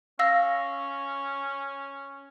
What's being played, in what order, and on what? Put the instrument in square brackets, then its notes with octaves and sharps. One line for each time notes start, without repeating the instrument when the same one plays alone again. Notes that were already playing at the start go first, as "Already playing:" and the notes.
[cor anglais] C#4 [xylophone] F5 E6 A#6